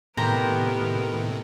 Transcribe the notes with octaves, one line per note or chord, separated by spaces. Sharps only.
A2 C3 D#3 B3 G4 A#4 C5 A#5